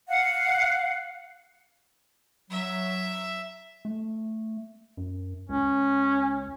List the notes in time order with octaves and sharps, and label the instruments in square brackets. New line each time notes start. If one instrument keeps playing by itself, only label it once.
[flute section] F5 F#5
[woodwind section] F#3 [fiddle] E5
[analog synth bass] A3
F#2
[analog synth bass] C#2 [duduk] C#4